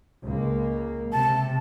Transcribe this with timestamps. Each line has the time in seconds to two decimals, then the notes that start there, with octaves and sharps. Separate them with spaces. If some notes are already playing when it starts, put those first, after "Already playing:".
0.23 C#2 A#3
1.13 C3 A5